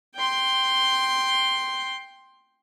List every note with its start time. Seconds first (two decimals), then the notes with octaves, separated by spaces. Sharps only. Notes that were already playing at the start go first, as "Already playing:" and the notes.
0.16 G5 C6